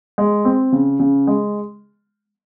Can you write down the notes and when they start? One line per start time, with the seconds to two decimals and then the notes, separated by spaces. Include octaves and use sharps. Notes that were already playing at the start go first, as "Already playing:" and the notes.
0.18 G#3
0.45 C4
0.72 C#3
1.00 C#3
1.27 G#3